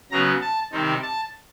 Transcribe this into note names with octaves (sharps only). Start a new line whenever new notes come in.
C#3 F#3 B3 A#5
A5
C3 D#3 G3 C4 D#4
A5